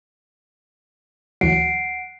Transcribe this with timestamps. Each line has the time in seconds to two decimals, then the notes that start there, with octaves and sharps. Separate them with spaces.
1.41 D2 E3 F#3 F#5 C7 D7